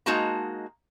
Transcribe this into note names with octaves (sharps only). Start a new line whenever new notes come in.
G#3 A#3 D#4 F#4 A5 A#5